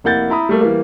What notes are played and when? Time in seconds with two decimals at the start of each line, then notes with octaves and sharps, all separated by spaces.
0.04 F1 A#3 E4 F#5 G6 A6
0.30 E4 A#5 B5 D#6
0.49 G3 A3 A#3
0.61 E3 G3 A#3